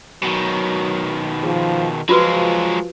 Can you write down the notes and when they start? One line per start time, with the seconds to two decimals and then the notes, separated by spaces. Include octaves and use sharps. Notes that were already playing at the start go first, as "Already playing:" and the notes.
0.23 B2 D#3 F#3 G#5
1.43 F3 G#4
2.09 F3 F#3 G#3 F4 F#4 B4